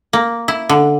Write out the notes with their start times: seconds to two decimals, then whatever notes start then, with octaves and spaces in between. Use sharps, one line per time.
0.13 A#3
0.48 E4
0.69 D3